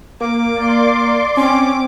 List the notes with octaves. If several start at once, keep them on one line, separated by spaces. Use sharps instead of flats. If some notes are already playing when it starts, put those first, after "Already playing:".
A#3 D6
D5 C6
C4 C#4 D6